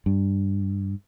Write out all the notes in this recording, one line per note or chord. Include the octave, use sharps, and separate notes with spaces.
G2